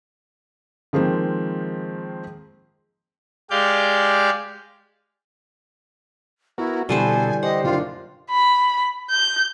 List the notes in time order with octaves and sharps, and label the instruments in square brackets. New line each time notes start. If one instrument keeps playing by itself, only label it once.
[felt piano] D#3 F3 G#3 A#3 C4
[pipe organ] G#3 G4 D5 F5 G6
[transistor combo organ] B3 F#4 A#4 [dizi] E4 [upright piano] C#6
[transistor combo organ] B2 A4 [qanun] D3 B4 C5 [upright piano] E3 G3 [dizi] G#5
[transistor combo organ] G4 C5 [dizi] D#5 [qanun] F#5
[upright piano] F#1 D4 [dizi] F4
[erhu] B5
G6